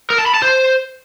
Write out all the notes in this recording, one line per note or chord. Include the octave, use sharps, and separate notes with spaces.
A#4
A5
B5
A5
C5